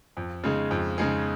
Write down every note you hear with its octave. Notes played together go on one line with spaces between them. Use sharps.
F2
C#3 G#3 D#4 G#4
F2
C#3 G#3 D#4 G#4